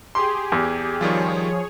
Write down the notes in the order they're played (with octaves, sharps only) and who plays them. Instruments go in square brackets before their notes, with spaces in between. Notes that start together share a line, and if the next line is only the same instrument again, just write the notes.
[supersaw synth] G4 G#4 [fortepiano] C6
[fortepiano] E2
[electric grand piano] D#3 G3 F4 [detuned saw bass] F3 [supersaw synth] G#4 C#5